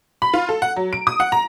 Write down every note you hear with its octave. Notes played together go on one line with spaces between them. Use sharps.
B5
F4
A4
F#5
F#3
D7
D#6
F#5
A#5